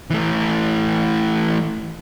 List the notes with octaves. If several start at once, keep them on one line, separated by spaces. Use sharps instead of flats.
E3 A3